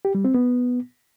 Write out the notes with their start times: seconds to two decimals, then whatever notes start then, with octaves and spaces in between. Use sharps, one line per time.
0.05 G4
0.15 G3
0.25 C4
0.35 B3